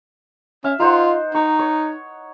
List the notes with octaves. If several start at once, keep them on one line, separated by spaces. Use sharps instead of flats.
C#4 E5 F5
D#4 F4 C5 F#5
D#4 C#6
C#5